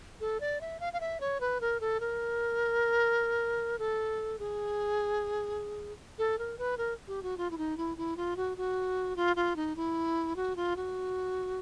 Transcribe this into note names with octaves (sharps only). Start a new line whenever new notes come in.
A4
D5
E5
F5
F5
E5
C#5
B4
A#4
A4
A#4
A4
G#4
A4
A#4
B4
A#4
G4
F#4
F4
E4
D#4
E4
E4
F4
F#4
F#4
F4
F4
D#4
E4
F#4
F4
F#4